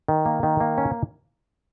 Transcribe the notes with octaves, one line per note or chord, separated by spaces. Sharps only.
D#3
A#3
D#3
A#3
C#4